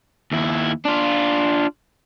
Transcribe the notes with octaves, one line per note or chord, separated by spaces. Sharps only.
D#2 E4
D4 F4